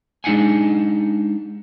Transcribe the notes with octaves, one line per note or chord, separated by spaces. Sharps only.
G#3 D4 D#4 F5 F#5 G#5